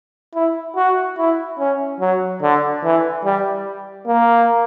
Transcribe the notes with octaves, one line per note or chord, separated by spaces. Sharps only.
E4
F#4
E4
C#4
F#3
D3
E3
G3
A#3